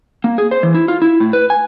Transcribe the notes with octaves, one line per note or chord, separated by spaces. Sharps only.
A#3
G#4
C5
E3
E4
F4
E4
A2
B4
G#5